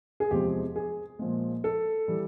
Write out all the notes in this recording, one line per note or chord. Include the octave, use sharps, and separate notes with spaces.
G#4
E2 C3 F3 G#3 G4
G#4
A#2 F3 G#3
A4
E3 G3